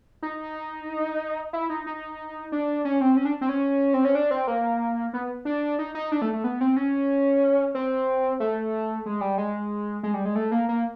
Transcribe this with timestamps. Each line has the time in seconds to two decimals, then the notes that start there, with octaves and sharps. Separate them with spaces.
0.22 D#4
1.53 E4
1.70 D#4
1.86 D#4
2.52 D4
2.85 C#4
3.01 C4
3.17 C#4
3.25 D4
3.41 C4
3.49 C#4
3.94 C4
4.05 C#4
4.15 D4
4.31 C4
4.47 A#3
5.13 B3
5.45 D4
5.79 D#4
5.95 D#4
6.12 D4
6.22 A3
6.33 A3
6.44 B3
6.61 C4
6.76 C#4
7.75 C4
8.40 A3
9.06 G#3
9.21 G3
9.38 G#3
10.03 G#3
10.14 G3
10.25 G#3
10.35 A3
10.52 A#3
10.69 A#3